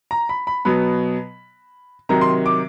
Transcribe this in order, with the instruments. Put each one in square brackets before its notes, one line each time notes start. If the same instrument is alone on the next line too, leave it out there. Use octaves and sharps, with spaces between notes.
[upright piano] A#5
B5
B5
B2 F#3 B3 B5
C3 D#3 F#3 A#5
C6
D6